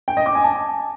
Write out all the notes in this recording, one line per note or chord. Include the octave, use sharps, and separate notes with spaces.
G5
D#5
D6
G#5
A5